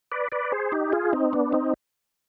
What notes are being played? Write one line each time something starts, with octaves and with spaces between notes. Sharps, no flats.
B4 D5
B4 D5
G#4 C5
D#4 G4
F4 G#4
C4 D#4
B3 D4
C4 D#4